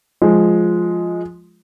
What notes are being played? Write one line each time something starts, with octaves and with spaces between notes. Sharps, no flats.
F3 G#3